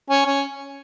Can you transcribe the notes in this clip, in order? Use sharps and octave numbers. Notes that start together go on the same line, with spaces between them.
C#4
C#4